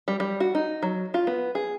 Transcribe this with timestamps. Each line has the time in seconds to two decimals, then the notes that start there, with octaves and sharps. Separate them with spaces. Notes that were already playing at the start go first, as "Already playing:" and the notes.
0.08 G3
0.20 G3
0.40 F#4
0.55 D#4
0.83 F#3
1.14 F4
1.27 B3
1.55 G#4